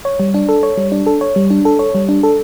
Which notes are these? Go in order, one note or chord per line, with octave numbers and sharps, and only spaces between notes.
C#5
G3
D4
A4
C#5
G3
D4
A4
C#5
G3
D4
A4
C#5
G3
D4
A4